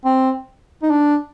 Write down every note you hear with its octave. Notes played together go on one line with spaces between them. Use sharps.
C4
D#4
D4